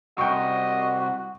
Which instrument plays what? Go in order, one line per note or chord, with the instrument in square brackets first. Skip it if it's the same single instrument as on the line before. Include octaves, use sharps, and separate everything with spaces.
[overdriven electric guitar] C2 [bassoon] F#4 [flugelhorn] D#5 [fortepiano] G5 C#6